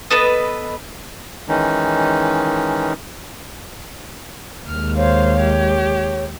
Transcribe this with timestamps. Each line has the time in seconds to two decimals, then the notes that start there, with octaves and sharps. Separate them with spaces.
0.11 B3 A4 B4 D#5
1.48 D#3 E3 G#3 C#4 D#4
4.67 D#2 G#3 F6
4.97 C5 C#5 F5
5.40 G4